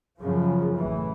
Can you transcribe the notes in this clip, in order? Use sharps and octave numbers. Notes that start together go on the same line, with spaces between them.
F#2 C#3 F3
A1 A2 E3